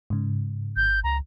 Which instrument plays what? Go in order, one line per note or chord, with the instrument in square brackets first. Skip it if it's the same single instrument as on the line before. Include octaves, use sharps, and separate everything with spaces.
[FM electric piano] G#2 C#3
[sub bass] G#1 [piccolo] G6
[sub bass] C#2 [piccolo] A#5